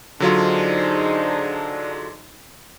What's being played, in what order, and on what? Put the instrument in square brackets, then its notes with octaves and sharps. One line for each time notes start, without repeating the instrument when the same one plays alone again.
[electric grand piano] D3 F#3 F4 [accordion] D4 [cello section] D#4 G#4 C5